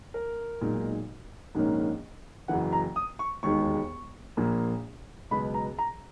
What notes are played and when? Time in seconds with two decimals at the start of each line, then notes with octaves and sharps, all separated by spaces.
0.14 A#4
0.61 B1 A#2 G#3 D#4
1.55 A#1 G#2 D#3 A#3 C#4
2.48 F#1 F#2 E3 F#5
2.73 A#5
2.96 D#6
3.19 C#6
3.43 E1 D#2 D#3 G#3 C#6
4.37 A#1 A#2 A#3
5.31 C#2 B2 F#3 B3 B5
5.54 A#5
5.79 A#5